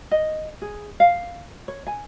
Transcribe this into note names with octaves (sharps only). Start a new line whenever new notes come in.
D#5
G#4
F5
C#5
G#5